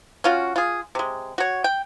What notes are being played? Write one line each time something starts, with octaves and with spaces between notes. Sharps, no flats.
C#4 F4 F#4
F4 G#4
C3 G#3
F#4 C#5
G5